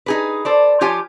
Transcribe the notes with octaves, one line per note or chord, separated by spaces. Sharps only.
D#4 G#4 B4
A4 C5 D5
F3 F4 G4 C#5 G#5